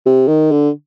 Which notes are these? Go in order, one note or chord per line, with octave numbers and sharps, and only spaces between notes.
C3
D#3
D3